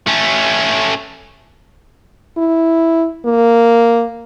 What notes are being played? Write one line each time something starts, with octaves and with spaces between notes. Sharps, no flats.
A3 C#4
E4
A#3